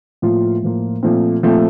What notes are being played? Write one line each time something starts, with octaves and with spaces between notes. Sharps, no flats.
A2 F3 A#3 F4
A2 F3 A#3 F4
A#2 F3 A3 C4
A#2 F3 A3 C4